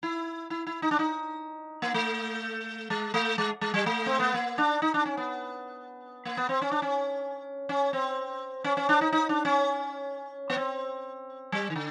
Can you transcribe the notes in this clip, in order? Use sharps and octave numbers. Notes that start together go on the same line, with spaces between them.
E4
E4
E4
D#4
D4
D#4
A#3
A3
G#3
A3
G#3
G#3
G3
A3
C4
B3
A#3
D4
D#4
D4
C#4
B3
A#3
B3
C4
C#4
D4
C#4
C#4
C4
C#4
C#4
D4
D#4
D#4
D4
C#4
B3
C4
G3
D#3
D3